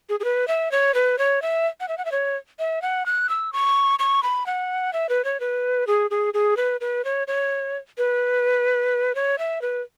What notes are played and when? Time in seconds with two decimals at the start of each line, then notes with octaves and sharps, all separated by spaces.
0.09 G#4
0.20 G#4
0.24 B4
0.48 E5
0.72 C#5
0.94 B4
1.18 C#5
1.42 E5
1.80 F#5
1.88 E5
1.98 F#5
2.05 E5
2.12 C#5
2.59 E5
2.82 F#5
3.06 F#6
3.29 E6
3.53 C#6
3.99 C#6
4.23 B5
4.46 F#5
4.93 E5
5.09 B4
5.25 C#5
5.40 B4
5.87 G#4
6.11 G#4
6.34 G#4
6.57 B4
6.81 B4
7.05 C#5
7.27 C#5
7.98 B4
9.15 C#5
9.39 E5
9.62 B4